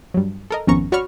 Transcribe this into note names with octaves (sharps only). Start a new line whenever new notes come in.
G2 F#3
A4 A#4 D#5
G#1 F2 B3 C#4 A#5 C#6
F#4 C#5 D5 B5 C#6 F6